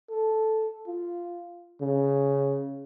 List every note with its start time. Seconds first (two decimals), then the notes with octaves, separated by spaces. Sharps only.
0.11 A4
0.88 F4
1.81 C#3